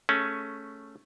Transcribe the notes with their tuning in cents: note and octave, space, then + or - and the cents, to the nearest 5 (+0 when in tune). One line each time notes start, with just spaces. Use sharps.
A3 +0 C#4 +0 G#4 +0